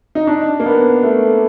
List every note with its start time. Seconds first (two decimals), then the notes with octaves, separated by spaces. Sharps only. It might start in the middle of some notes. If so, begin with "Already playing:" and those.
0.15 D#4
0.27 D4
0.60 A#3
0.66 B3
1.03 A3